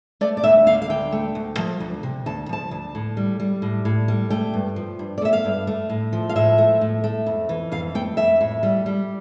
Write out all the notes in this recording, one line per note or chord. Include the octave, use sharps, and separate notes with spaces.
A3 D5
D5
D2 E5
D3 F5
F5
D2 G5
A3
D2
F3
D2
C3
D2 A5
F3 A5
D2
A2
G3
G3
A2
A2
G3
A3 G5
G2
F3
G2
D5
A3 E5
F5
G2
A3
A2
F3
F5
A2 E5
A3
A2
A3
F2
E3
F2 F5
A3 G5
F2 E5
A2
G3
G3